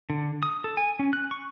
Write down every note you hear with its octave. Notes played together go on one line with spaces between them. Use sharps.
D3
D#6
A4
G#5
C#4
F#6
C#6